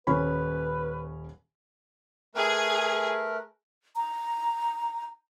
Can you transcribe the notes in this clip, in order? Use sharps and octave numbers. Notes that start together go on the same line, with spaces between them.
D#1 C#4 B4 B5
A3 G#4 A#4 B4
A#5